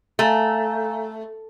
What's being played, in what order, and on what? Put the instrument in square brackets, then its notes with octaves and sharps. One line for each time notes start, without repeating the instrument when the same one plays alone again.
[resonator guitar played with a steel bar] A3 [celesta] F5 G#5 A#5